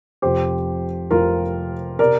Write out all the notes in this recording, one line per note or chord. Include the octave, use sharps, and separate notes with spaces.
F1 F2 C3 G4 C5
F1 F2 C3 F4 A#4
C3 A#4 D5